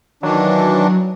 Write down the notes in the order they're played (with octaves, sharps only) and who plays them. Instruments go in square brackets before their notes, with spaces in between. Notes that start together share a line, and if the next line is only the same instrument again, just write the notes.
[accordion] D#3 E3 D4 [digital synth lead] F#3